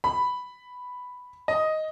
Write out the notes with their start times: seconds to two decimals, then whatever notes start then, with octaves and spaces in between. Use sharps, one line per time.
0.04 B5
1.48 D#5